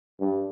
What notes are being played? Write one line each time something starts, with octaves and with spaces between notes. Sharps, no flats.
G2